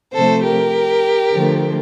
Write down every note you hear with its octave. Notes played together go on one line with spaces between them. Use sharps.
C3 F3 A3 A4 C5
G4 A#4
D3 F3 A3